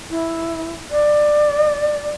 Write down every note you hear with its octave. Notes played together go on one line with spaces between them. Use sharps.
E4
D5